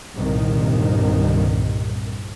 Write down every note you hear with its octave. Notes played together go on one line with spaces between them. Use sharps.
G1 C2 G2 A#2 D#3